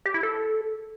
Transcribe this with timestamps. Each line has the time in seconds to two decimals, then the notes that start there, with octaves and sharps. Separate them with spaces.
0.06 G4
0.14 E4
0.23 A4